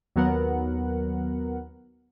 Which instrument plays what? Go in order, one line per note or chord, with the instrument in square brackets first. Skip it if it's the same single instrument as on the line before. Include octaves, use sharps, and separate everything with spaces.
[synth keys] D#2 F#3 B3 A#4 F#5